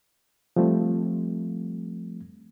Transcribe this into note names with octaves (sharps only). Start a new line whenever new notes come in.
F3 G3 A3 C4